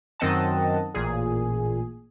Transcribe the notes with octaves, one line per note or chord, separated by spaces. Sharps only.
F#2 D#3 C4 D#5 F#5 A5
A1 A#2 G#4